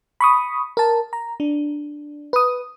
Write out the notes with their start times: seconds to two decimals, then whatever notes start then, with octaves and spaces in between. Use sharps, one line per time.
0.20 B5 C#6 D#6
0.77 A#4 A5
1.13 A#5
1.40 D4
2.33 B4 D#6